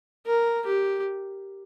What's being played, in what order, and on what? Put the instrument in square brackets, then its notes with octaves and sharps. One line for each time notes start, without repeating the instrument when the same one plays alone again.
[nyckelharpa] A#4
G4